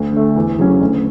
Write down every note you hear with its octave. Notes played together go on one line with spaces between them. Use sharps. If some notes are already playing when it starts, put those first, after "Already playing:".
Already playing: D2
D3 A3
E2
C#3 F#3 C#4
D2